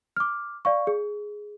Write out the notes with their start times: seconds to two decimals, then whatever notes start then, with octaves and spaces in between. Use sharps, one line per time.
0.16 D6 F6
0.65 D5 F5 C#6
0.87 G#4